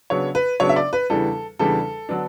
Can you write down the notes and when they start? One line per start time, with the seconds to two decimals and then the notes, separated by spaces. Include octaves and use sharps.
0.10 C#3 F#3 B3 D4 C#5
0.35 B4
0.60 C#3 F#3 B3 D4 C#5
0.69 E5
0.76 D5
0.93 B4
1.10 E2 C#3 E3 G3 D4 A4
1.59 E2 C#3 E3 G3 D4 A4
2.09 D3 F#3 B3 D4